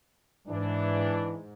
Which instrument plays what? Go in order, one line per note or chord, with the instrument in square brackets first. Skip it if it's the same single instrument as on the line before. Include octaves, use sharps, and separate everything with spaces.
[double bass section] G#2 [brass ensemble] E3 D4